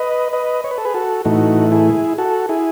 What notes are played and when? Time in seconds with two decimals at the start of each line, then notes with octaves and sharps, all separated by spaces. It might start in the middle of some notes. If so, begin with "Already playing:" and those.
Already playing: B4 D#5
0.33 B4 D#5
0.64 C#5
0.71 B4
0.78 A4
0.85 G#4 B4
0.94 F#4 A4
1.25 A2 E3 A3 D#4 F#4
1.72 E4 G#4
2.18 F#4 A4
2.49 E4 G#4